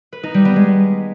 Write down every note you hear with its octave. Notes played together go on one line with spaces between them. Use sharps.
B4
D#4
G3
B3
G#3